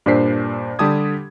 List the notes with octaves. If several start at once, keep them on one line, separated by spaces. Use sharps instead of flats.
G2 A#2 D4 C5 B6 C7
D3 G3 G4 A5 D#6 G#6